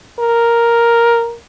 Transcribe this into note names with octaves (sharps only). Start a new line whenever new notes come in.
A#4